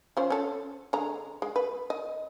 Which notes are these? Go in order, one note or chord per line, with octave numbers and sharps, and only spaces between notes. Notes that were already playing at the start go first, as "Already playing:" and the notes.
F3 C#4 C5
C#4 A4
D3 G#3 A#5
G#3
B4
D#5